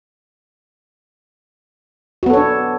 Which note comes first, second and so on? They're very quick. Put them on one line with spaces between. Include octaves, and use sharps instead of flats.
F#4 B3 A4 C#5 D4